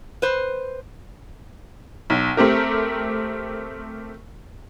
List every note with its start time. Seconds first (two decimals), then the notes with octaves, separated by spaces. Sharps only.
0.22 B4 C5
2.10 B1
2.37 A3 C4 G4 A#4